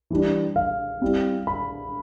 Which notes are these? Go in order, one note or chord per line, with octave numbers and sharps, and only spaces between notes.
E3 G3 D4
F5
G3 C4 E4
B5